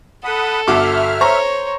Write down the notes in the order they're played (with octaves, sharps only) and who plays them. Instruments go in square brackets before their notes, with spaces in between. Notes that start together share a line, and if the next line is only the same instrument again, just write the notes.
[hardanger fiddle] A4 [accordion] F#5 B5 D#6
[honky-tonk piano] G1 F#4 D6 [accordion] E5 F6
[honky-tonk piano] C5 A#5 C#6 [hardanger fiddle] C#5